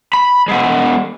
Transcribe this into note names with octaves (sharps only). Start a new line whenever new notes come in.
B5
G#3 B3